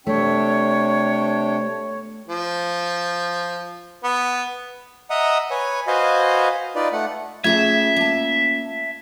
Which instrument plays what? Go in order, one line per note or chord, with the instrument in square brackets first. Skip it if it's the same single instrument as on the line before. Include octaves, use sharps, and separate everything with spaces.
[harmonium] C3 D4 G5 [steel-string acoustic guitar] A3 [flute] C#5
[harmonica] F3
B3
[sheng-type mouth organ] D#5 E5 F#5 A#5 D#6
B4 C#5 G#5
F#4 B4 C5 D#5 F5 G#5
D#4 F4 B4 D5
A3 F#5
[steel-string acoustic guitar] A3 G#4 A5 [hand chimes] C#4 F4 G#6 [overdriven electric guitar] E5
[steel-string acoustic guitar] A#3 A5